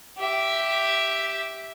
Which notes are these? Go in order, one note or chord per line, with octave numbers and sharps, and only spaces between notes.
G4 E5